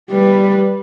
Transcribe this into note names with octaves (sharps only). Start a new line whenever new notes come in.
G3 B4